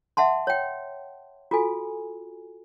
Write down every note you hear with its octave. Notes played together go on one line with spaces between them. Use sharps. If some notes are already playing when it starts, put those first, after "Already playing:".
E5 F#5 A5 C6
C#5 G5
F4 F#4 A4 G#5